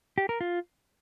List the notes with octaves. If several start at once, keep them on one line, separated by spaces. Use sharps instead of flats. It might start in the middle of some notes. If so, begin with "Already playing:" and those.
G4
A#4
F4